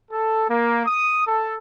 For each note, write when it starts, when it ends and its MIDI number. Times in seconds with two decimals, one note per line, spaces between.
0.11 0.45 69
0.49 0.86 58
0.86 1.24 87
1.27 1.56 69